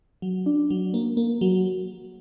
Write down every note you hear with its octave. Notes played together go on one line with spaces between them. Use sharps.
F#3
D4
F#3
A#3
A#3
F#3